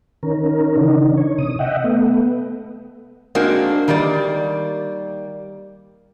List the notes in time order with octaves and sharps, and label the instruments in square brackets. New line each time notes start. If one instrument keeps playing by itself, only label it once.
[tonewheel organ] D#3 C#4 A#4
C#3 E3 D4 D#4
C#5
C3 D#6
D#5 E5 F#5 G5
A3 B3
[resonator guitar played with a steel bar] G#3 A#3 C4 D4 F#4
D#3 G3 A#3 D5